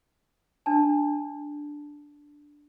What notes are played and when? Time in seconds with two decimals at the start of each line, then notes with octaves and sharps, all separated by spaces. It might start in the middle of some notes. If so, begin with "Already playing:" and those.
0.66 D4 A5